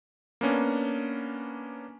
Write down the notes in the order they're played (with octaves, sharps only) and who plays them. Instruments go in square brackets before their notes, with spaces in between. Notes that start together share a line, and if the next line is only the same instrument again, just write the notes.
[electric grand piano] A#3 B3 C#4 D4